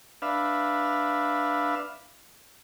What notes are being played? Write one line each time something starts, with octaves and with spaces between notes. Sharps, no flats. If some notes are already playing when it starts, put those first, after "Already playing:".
D4 B4 E5 F5